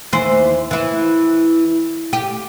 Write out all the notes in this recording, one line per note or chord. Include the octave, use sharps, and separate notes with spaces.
D#2 E3 C5
E3 E4
G4